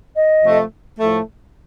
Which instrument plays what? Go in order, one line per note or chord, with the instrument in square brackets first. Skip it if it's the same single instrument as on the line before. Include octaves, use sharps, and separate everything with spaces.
[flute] D#5
[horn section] C3 F3 A3
A2 F3 A3